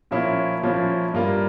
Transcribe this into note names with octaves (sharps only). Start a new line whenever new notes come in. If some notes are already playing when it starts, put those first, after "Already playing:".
A#2 F3 A#3 C#4 E4
A#2 F3 A#3 C#4 E4
G2 G3 A#3 F4 A#4